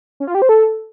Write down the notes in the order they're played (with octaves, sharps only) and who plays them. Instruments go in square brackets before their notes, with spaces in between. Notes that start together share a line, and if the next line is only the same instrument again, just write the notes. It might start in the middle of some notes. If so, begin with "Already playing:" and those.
[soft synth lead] C#4
F4
G4
C5
A4